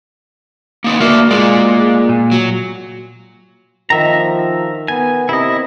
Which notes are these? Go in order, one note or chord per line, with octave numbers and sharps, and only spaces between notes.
A#3 D#4 B4
A#3 F#4 D5 E5
G#3 A#3 F4 D5
A#2
F#3
D#3 F3 E5 A#5
B3 G#5
C3 E4 D#5